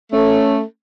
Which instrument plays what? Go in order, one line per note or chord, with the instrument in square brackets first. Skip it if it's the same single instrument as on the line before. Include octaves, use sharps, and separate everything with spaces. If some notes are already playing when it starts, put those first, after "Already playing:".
[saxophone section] A3 [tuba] C#4